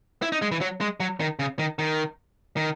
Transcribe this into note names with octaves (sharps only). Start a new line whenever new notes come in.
E4
D#4
G#3
E3
F#3
G#3
F#3
D#3
C#3
D#3
D#3
D#3